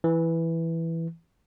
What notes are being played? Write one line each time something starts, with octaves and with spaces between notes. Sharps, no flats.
E3